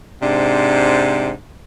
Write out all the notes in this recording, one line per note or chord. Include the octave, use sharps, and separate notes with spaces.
G#2 C3 D4